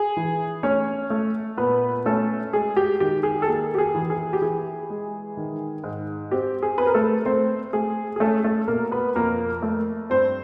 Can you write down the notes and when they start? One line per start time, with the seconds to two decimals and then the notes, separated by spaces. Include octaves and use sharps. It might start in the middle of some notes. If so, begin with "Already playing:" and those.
Already playing: G#4
0.17 E3
0.63 A3 C#4 C#5
1.10 A3
1.58 A#2 B3 B4
2.06 A3 C#4 A4
2.53 G#3 G#4
2.77 G4
3.00 D#3 G4
3.23 G#4
3.42 A4
3.47 A#3 G#4
3.75 G4
3.78 G#4
3.95 E3
4.10 G#4
4.33 G4
4.42 E3 G#4
4.90 G#3
5.37 D#3
5.84 G#2
6.31 C4 G4
6.62 G#4
6.78 C4 B4
6.87 A#4
6.94 A3 A4
7.26 A3 C4 C5
7.73 A3 G#4
8.16 G#4
8.20 A3 C#4 A4
8.44 A3 A4
8.68 B2 A#3 A#4
8.91 B3 B4
9.16 F2 A#3 A#4
9.62 A3
10.10 G2 C4 C5